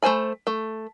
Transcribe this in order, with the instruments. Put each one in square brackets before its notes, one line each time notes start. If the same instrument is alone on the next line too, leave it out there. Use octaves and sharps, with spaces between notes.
[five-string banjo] A3 F#4 C5 G#5 B5
A3